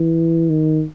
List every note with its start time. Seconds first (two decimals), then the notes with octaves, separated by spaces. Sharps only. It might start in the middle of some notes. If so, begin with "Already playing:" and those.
Already playing: E3
0.49 D#3